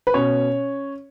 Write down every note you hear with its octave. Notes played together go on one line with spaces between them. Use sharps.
B4
B2 C#4 C#5